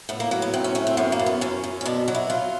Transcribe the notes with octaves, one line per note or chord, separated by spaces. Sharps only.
A2 B3
A#3
F#3 A#3
B3
A2 C4
C#4
A3 C#4
C4
F#2 B3
A#3
F#2
B3
F#2 C#4
F#2
C#4
B2 D4
F#3
E4
F#3 F4